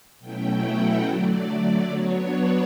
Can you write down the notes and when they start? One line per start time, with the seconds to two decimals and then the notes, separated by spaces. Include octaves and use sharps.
0.19 B2 F#3 A3 C#4 E4 G5
0.61 F#5
1.05 D3 F#3 A3 D5
1.47 D5
1.89 F#3 B3 D4 C#5
2.33 B4